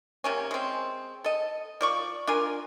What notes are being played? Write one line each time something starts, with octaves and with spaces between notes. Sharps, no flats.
C3 A#3 C#4
G#3 C4
A4 D#5
F3 D5 C#6
D4 F4 A#4 G#5